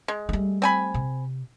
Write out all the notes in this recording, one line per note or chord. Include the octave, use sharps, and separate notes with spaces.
G#3
G3 A3
C4 G#5 B5
C3